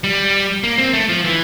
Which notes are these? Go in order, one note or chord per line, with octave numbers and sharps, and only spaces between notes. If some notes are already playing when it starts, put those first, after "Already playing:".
G3
A#3
C4
A3
F3
E3